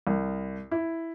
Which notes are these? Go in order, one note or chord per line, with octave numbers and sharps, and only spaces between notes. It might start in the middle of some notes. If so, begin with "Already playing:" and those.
C2
E4